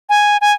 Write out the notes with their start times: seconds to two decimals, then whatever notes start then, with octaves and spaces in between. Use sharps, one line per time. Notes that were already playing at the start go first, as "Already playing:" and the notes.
0.09 G#5
0.41 G#5